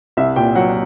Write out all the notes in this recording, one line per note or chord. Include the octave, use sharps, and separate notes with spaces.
C2 E5
A#2 G5
F#3 F#5